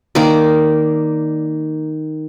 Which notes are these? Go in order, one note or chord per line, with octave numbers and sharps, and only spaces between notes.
D#3 A#3 D5